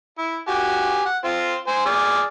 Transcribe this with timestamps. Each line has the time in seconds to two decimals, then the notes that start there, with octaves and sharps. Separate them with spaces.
0.18 E4
0.48 F#4 G4 G#5
1.05 F#5
1.24 C4 F4
1.67 C5 G#5
1.86 G#4 D5 F6